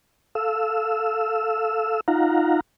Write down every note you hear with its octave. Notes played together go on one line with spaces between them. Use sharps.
A4 F5 E6
D#4 F4 F5 F#5 A#5